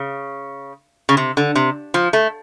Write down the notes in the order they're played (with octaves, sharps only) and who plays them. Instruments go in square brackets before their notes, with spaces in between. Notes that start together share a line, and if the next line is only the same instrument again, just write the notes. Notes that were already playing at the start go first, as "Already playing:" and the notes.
Already playing: [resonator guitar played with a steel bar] C#3
C#3
C3
D3
C3
F3
A3